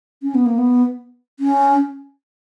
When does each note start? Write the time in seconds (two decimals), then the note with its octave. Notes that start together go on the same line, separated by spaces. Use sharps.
0.23 C#4
0.35 B3
0.46 A#3
0.58 B3
1.40 C#4